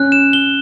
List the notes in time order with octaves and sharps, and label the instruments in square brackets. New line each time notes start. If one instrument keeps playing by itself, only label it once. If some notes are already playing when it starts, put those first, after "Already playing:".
Already playing: [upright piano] C#4 [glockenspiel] F#6
[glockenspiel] E7
G7